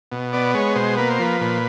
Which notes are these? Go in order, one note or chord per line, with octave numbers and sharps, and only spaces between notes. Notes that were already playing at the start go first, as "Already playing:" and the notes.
B2
B3 D5
G#3 C#5
B2 C5
A#3 B4
C5
F3 B4
A#2